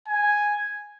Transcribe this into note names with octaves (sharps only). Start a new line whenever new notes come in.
G#5